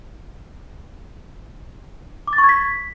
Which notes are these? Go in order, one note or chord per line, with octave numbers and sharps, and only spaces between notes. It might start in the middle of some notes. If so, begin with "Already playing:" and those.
D6
A6
C#6
G#6
B6